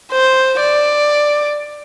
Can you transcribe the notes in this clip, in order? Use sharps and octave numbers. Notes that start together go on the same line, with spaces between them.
C5
D5